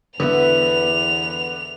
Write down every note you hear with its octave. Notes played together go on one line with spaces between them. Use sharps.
E2 D3 B3 B4 E5 F7